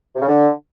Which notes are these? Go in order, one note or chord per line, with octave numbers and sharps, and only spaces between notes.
C3
C#3
D3